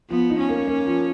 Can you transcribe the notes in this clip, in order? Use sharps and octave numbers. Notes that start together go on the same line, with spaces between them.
F3 B3
D#4
C#4
A#3
A#3
F3